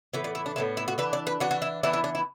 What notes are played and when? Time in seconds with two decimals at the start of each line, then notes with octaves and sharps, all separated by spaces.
0.13 A2 E3 B3 E5
0.24 D5
0.35 E4
0.46 D4
0.56 A2 E3 B3 D4 E4
0.77 E4
0.88 F#4
0.98 E3 D4 B4
1.13 D5
1.27 B4
1.40 E3 D4 F#4
1.51 F#4
1.62 E4
1.83 E3 B3 D4 E4
1.93 E4
2.04 D4
2.15 E4